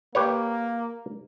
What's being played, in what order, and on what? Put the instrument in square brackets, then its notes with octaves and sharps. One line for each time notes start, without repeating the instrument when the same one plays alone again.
[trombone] A#3 [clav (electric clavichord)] G4 B4 C#5